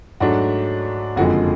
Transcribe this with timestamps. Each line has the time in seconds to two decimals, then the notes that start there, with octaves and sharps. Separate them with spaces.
0.20 G#2 F#3 A3 D4 F#4
1.16 F#1 F2 D3 F3 G#3 F#4